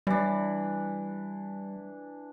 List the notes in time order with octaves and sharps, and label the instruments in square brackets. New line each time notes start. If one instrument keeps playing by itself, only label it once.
[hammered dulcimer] E3 D4 [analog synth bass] G3